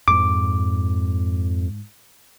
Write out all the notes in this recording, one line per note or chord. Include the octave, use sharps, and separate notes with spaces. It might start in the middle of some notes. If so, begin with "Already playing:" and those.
F2 G#2 D6